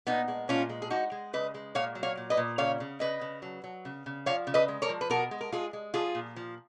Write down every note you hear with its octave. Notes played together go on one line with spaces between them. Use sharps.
A#2 B3 D#4
G#3
A#2 C#4 F4
G#3
G#4
G#3 D#4 F#4
G#3
C#3 B4 D#5
G#3
A#2 C#5 F5
F#3
C#5 F5
A#2
B4 D#5
A#2
C#3 C#5 F5
C#3
C#3 B4 D#5
C#3
F#3
F#3
C#3
C#3
F3 C#5 F5
C#3
B4 D#5
G#3
A#4 C#5
F3
B4
B2 F#4 A#4
G#3
A#4
G#3 F4 G#4
G#3
F3 F4 G#4
A#2
F3